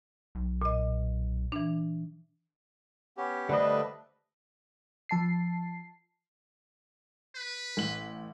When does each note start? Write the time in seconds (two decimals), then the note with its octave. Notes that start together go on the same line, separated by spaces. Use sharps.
0.35 B1
0.62 A#2 D#5
1.52 E3 D4
3.17 B3 C#4 G4
3.49 D3 G3 A3 D4 B4 C5 D5 D#5
5.09 F3 A5 C7
7.35 B4
7.77 A1 F#7